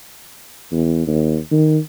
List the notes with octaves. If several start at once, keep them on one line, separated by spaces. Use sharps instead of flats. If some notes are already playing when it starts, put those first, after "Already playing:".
E2
D#2
D#3